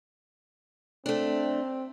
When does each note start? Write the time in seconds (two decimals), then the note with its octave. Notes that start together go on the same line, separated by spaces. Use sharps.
1.06 A3 C4 D4